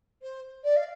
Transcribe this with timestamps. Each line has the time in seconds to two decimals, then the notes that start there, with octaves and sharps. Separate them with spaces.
0.22 C5
0.64 D5
0.76 F5